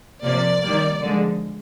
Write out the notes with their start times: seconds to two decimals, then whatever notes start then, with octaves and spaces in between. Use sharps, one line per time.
0.24 C3 F3 A#3 D5
0.62 D#3 G3 A#3
1.01 D3 F3 G#3